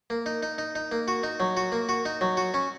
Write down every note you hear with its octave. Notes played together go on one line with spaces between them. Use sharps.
A#3
D#4
D#4
D#4
D#4
A#3
F#4
D#4
F#3
F#4
A#3
F#4
D#4
F#3
F#4
C#4